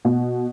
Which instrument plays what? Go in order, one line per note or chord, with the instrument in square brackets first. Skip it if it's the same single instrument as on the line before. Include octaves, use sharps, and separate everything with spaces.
[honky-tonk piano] B2